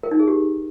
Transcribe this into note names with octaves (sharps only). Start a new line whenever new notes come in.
A#4
D#4
G#4
G4